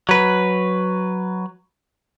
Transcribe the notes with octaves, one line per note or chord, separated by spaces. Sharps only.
F#3 B4